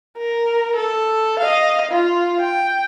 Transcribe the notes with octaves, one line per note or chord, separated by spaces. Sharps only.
A#4
A4
D#5 F5
F4
G5